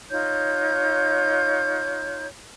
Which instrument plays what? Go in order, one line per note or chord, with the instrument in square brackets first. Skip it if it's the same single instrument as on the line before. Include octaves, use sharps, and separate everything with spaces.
[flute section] D#4 F4 C#5 G6